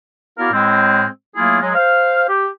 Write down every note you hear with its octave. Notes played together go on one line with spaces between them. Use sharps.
B3 E4 F#4 A#4 D5 F5
A2 G#3 C4
F#3 A3 A#3 E4 F4 G#4
F#3 G#3
C5 F5
G4